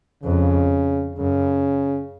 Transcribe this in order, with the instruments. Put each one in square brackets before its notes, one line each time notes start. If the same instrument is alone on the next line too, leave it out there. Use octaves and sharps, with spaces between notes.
[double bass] F2 [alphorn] C#3
[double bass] F#2 [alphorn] C#3